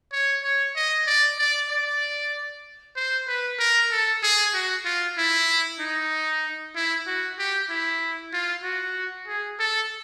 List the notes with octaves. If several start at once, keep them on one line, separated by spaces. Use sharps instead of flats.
C#5
C#5
D#5
D5
D5
D5
C5
B4
A#4
A4
G#4
F#4
F4
E4
D#4
E4
F#4
G4
E4
F4
F#4
G#4
A4